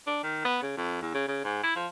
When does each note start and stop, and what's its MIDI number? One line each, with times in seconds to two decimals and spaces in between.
0.07 0.22 62
0.23 0.45 51
0.45 0.58 59
0.62 0.73 49
0.77 0.98 41
1.01 1.09 40
1.14 1.25 49
1.28 1.40 49
1.44 1.59 44
1.63 1.74 64
1.76 1.87 53